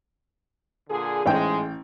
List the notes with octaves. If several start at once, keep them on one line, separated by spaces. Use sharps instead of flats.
A#2 D3 G#4
A1 G#2 G#3 G5